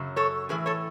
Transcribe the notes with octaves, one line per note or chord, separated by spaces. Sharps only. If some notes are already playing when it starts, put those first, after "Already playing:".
Already playing: F#2 C#3 F#3
A4 C#5
A2 E3 G#4 B4
A4 C#5